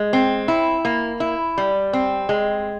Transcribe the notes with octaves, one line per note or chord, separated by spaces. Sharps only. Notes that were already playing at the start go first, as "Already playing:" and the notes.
Already playing: G#3
C4
E4
A#3
E4
G3
C4
G#3